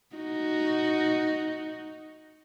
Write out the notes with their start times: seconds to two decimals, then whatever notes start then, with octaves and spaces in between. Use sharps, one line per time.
0.16 D#4 F#4